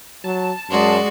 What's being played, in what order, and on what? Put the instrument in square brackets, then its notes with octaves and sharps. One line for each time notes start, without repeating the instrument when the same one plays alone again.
[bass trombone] F#3 [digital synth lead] A5
[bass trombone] F#2 [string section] G#3 C6 [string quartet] F#4 D5